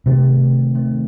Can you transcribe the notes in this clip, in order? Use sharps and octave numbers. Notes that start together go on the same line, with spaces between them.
C3 D#3 A3 C4
D#3 A3 C4